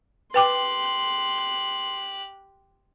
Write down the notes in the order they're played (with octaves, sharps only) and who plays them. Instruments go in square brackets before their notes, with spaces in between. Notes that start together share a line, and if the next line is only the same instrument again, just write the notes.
[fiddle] G4 F#6 [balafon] B4 G5 D6 [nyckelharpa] C6